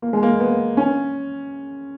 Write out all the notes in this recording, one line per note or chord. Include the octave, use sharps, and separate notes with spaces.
A#3
G#3
A#3
B3
C#4